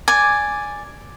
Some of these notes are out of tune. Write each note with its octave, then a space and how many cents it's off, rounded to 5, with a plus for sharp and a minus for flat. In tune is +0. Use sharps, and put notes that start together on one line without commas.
D5 +0 G#5 +0